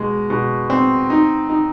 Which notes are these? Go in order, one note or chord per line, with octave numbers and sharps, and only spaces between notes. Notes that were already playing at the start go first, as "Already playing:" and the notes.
Already playing: B2 G#3
B2
C4
D#4
D#4